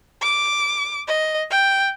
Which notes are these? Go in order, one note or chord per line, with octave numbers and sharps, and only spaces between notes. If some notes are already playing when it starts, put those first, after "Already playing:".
D6
D#5
G5